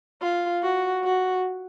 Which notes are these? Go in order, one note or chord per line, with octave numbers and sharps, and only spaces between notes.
F4
F#4
F#4